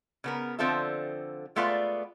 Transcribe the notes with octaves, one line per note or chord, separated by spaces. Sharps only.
C#3 B3 A#4
D3 F3 C4 F4 A4 E5
G#3 A3 B3 F4 B4 D5